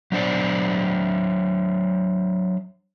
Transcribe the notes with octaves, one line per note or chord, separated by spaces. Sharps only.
F#3 D4 C5 D5